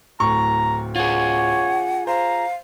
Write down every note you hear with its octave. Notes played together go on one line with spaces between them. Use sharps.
D1 A2 A#5 C#6
F4 G#4 C#5 F#5
C5 F5 A#5